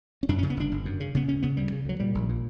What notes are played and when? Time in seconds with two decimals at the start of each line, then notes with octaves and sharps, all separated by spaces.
0.23 C#4
0.29 F#2 D4
0.39 C#4
0.43 C#3
0.50 B3
0.57 G1 D4
0.72 G1
0.85 F#2
1.00 C#3
1.15 C#3 B3
1.28 D2 C#4
1.43 C#3 B3
1.57 D2 G3
1.72 C#3
1.85 D2 F#3
2.00 A#2 G3
2.15 A#1
2.29 A#2